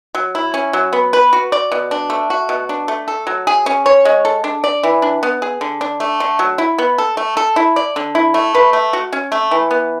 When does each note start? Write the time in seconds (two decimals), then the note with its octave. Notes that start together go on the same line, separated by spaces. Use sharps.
0.15 F#3
0.35 E4
0.54 C#4
0.73 F#3
0.93 B3
1.13 B4
1.33 F#4
1.52 D5
1.72 B2
1.91 D4
2.10 A3
2.30 F#4
2.49 B2
2.69 D4
2.88 A3
3.08 A4
3.27 F#3
3.47 G#4
3.66 C#4
3.86 C#5
4.05 G#3
4.25 A4
4.44 D4
4.64 D5
4.83 E3
5.02 D4
5.23 B3
5.42 G#4
5.61 D3
5.81 D4
6.00 A3
6.20 D3
6.39 F#3
6.58 E4
6.78 B3
6.98 A4
7.17 A3
7.37 A4
7.56 E4
7.76 D5
7.96 D3
8.15 E4
8.34 A3
8.55 B4
8.73 A3
8.93 F#4
9.13 C#4
9.32 A3
9.51 E3
9.71 B3